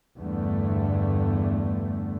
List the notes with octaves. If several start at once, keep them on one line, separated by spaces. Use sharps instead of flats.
E2 G2 D3 A3